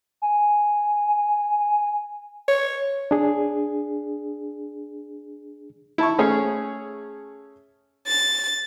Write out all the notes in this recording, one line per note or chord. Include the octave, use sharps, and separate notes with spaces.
G#5
C#5
D4 G#4
E4 A5 C#6
A3 C#4 G#4 C#5
A6